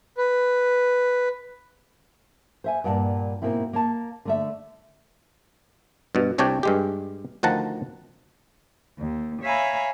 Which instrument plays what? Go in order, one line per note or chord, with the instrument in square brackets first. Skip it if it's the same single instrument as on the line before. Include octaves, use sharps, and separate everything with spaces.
[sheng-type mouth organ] B4
[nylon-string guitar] C5 E5 G#5
G2 A#2 F#5 G5 A5
G#2 B2 A#3 C4 E4
A#3 C#5 A5
D3 A3 E5
[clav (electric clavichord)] G2 B2
C2 C3 D4 C#5 D5 G5
G2 G#3 G4
D2 D#3 F3 F#5 A5 A#5
[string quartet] D#2
C#5 E5 F5 G#5 A#5 B5